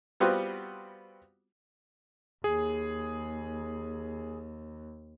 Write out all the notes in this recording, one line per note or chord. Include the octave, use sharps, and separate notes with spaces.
G3 B3 C4 F4 F#4
D#2 G#4